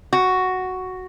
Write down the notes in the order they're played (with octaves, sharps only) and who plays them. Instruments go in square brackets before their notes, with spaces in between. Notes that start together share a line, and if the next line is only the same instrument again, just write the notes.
[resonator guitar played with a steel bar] F#4